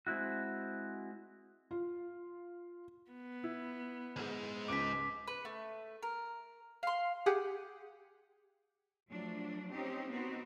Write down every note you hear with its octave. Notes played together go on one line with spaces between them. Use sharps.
G#3 C4 E4 F#4
F4
B3
E4
D2 G#2
C#2 D6 B6 D7
B4
A3
A#4
F5 C6
G4 G#4 F#5
F3 F#3 A3 D4
C4 C#4 D#4 G4 C5
B3 C4 D#4 F#4 C5